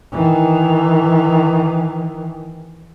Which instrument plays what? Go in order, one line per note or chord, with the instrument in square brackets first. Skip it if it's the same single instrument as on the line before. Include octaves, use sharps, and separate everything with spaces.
[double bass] D#3 E3